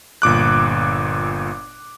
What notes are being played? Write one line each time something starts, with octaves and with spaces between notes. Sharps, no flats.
G1 A#2 D6 F#6